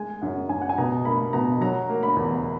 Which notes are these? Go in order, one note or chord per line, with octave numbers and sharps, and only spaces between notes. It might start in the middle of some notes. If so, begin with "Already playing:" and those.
Already playing: G#3 G#5
F#2 F#5
F#2 G#5
F#5
G#5
B2 A#5
A#3 B5
B2 A#5
F#3 A#5
A#3
B5
E2